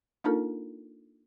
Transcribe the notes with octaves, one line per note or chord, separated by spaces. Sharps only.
A#3 D4 D#4 F4 A4 A#4